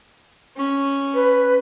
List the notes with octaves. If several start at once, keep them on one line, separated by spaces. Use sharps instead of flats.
C#4 C#6
B4